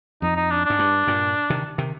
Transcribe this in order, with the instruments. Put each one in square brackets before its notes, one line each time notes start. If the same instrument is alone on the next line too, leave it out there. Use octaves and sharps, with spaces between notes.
[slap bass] F2 [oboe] D#4
[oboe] D#4
D4
[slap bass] G#2 [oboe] D4
[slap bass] G2
G2 A#2
C3 D#3
C3 D#3